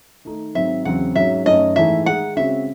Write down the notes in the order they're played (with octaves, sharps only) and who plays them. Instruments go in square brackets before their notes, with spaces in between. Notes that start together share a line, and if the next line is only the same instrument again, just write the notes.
[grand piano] D#3 A3 D#4 A4
[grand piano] G#2 D#3 F#3 C4 [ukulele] E5
[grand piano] E2 C#3 F#3 C4 [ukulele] F#5
[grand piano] G#2 F#3 C#4 F#4 [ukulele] E5
[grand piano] F#2 D#3 A3 C#4 [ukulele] D#5
[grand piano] G#2 E3 A3 D#4 [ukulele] E5
[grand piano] D#3 G#3 D#4 [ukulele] F#5
[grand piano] C#3 G#3 C4 F#4 [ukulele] E5